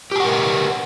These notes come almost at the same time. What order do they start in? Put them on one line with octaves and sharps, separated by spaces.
G4 G#5 F#5 A#4 B4